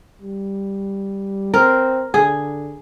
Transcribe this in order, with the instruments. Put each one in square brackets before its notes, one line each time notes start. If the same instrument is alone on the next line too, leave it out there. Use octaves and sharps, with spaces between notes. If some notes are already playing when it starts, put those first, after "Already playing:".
[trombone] G3
[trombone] C4 [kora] A#4
[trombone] D3 [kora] G#4